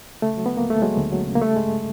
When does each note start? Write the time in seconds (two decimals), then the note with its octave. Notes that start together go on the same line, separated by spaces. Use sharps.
0.22 C#3 A3
0.37 F#3
0.46 B3
0.52 D2
0.57 A#3
0.68 D2 A3
0.82 F#3 G#3
0.97 D2
1.12 F#3
1.27 C#3
1.35 A#3
1.42 G3 A3
1.56 G2 G#3